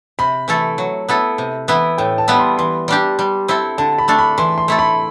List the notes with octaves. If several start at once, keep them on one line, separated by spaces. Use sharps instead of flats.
C3 B5
E3 A3 E4 A4
F#3
B3 E4 A4
C3
E3 B3 E4
A2 G5
A5
G3 B3 E4
C6
E3 C6
G3 D4 G4
G3
C4 E4 A4
D3 A5
B5
A3 D4 A4
B5
E3 C6
C6
A3 E4 A4
B5